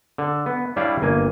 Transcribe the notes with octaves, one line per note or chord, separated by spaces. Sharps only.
D3
B3
G3 D4 E4 C#5 D5 F5
G1 A#3 G#5